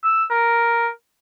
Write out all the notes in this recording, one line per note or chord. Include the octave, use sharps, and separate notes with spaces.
E6
A#4